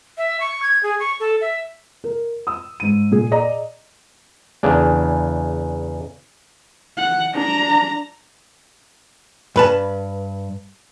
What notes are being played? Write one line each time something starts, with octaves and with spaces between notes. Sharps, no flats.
E5
C#6
G#6
G#4
C#6
A4
E5
A#4
D#6 E6
G#2 D#7
A#2 G#4
G#4 D5 D#5 A#5
E2 C#3 D4
F#5
D4 A#5
G2 B4 A5